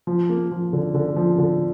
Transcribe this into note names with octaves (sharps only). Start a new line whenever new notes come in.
F3
A#3
F3
D3
D3
F3
D3